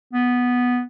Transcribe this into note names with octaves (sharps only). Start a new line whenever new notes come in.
B3